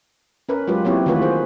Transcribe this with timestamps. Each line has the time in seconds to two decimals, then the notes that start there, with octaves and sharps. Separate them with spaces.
0.49 C#4 A#4 B4
0.68 F#3 G#3 F4 G4 B4
0.85 F#3 A#3 C4 E4 G4 C#5
1.06 D#3 E3 A3 F4 F#4 B4
1.22 G#4 C5